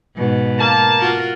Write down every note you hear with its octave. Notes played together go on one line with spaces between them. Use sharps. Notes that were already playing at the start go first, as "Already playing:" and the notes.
G#2 B2
A#3 A5
F4 F#4 A#4